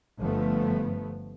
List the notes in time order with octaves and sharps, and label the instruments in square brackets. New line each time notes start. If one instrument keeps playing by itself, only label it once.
[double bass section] G1 F3 A3 B3